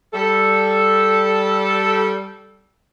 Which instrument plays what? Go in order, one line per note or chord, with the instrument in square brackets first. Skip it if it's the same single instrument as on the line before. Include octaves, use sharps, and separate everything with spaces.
[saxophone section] G3 A4